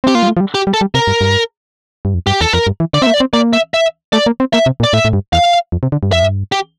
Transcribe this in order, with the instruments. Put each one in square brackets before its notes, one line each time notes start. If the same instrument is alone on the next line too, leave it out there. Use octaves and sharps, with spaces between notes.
[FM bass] C4 [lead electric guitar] G4
[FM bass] A#3 [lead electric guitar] F4
[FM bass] G3
A3
F3
G3
[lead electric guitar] G4
[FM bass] G3
[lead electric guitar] A4
[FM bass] G3
[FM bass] C3 [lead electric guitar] A#4
[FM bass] G2
G2
G2
F2
[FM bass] G2 [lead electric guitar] G4
[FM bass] E2 [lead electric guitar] A4
[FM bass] F2 [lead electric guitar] A#4
[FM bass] G2
E3
[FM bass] D3 [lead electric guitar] D5
[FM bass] A#3 C4 [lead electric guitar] E5
[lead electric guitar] D5
[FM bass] C4
[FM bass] A#3 [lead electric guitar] D5
[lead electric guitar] E5
E5
[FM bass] A3 [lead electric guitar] D5
[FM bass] A#3
C4
[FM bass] A#3 [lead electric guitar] E5
[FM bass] C3
A#2
[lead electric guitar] D5
[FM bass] A2 [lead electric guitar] E5
[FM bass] A2
G2
[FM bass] E2 [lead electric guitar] F5
[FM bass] F2
C3
D3
G2
[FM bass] F2 [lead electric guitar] E5
[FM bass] G2
[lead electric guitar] G4